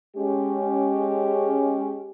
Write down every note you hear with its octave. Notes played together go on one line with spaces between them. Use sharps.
G#3 C#4 G4